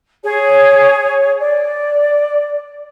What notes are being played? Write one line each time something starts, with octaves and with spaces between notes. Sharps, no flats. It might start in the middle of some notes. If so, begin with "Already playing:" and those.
G#4 C#5
D5